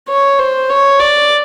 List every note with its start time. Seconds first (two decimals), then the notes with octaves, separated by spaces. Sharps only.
0.09 C#5
0.40 C5
0.70 C#5
1.00 D5